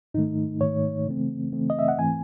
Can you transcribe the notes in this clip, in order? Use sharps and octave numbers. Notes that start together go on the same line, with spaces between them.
G#2 D#3 A3 D#4
G#2 D#3 A3 C#5
C#3 E3 A3 C4
C#3 E3 A3 C4
D#5
E5
F#5
G#2 E3 A3 C4 G#5